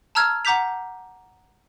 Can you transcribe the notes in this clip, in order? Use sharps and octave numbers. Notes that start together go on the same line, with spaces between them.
A5 A#5 E6 F6 G#6
F#5 A#5 D6 G6 B6 F7